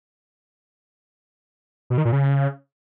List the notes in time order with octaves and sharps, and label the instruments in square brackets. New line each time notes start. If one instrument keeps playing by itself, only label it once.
[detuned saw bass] B2
D#3
A#2
C#3